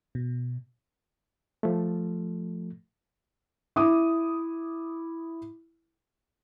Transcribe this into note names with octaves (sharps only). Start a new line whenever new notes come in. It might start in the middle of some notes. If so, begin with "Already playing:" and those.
B2
F3 A3
E4 D6 D#6